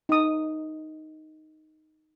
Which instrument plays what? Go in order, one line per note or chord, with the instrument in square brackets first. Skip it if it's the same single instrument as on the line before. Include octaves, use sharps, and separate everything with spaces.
[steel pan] D#4 D#6